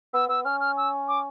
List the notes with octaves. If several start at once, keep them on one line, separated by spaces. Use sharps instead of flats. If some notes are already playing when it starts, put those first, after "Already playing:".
B3 E6
B3 E6
C#4 F6
F6
E6
D6